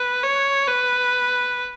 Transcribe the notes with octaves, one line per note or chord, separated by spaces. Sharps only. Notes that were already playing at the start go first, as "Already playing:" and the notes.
Already playing: B4
C#5
B4